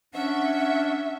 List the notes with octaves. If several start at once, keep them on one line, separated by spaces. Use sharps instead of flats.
C#4 D4 E5 F#5